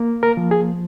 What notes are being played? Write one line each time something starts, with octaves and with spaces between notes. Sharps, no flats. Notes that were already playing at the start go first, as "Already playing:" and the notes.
Already playing: A#3
A#4
F3
G#4